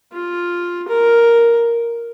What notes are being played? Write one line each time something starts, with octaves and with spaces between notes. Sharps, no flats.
F4
A#4